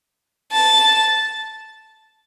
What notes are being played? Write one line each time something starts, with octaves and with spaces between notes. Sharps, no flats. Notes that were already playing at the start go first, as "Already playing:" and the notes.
A5